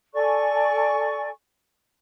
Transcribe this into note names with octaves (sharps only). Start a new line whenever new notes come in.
A4 D5 G#5 C#6